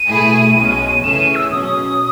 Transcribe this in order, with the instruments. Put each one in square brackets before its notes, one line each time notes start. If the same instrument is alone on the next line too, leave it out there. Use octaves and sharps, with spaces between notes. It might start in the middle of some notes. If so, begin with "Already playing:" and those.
Already playing: [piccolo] D#7
[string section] B2 A3 E4 G#4
B1 B2 G#3 C#4
[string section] C#3 E3 A3 C#4 G#4 [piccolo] E7
[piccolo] D#7
E6
[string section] B2 F#3 C#4 [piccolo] D#6